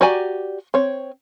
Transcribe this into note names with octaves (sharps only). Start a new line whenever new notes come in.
F#4 G4 D5 G#5 A#5
C4 C#5